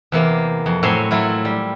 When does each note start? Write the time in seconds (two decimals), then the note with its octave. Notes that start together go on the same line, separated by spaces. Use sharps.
0.12 E2 C3 A#3
0.66 F2
0.83 A2 F#3 C4 C#5 G#5 C6
1.11 F#3 E4 F4
1.45 G3